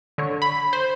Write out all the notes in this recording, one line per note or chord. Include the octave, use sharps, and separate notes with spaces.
D3 C#5
B5
C5